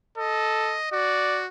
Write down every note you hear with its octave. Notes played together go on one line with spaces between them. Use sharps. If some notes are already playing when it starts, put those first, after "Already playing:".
A4 D#5
F#4 D5